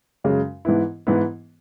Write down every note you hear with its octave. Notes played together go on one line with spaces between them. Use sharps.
F#2 C#3 G#3
G#2 E3 B3 E4
G#2 E3 B3 E4